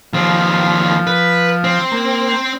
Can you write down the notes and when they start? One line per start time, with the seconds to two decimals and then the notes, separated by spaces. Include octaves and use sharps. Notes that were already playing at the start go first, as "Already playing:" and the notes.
0.13 D#2 F3 C4
1.07 B4
1.64 C4
1.92 A#3